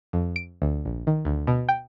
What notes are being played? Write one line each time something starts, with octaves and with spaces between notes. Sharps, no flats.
F2
D7
D2
A#1
D#3
D2
B2
G5